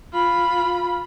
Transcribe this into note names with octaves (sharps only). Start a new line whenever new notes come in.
F4 B5